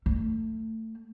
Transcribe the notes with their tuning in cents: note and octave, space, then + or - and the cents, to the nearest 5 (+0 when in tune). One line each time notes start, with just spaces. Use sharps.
A3 +20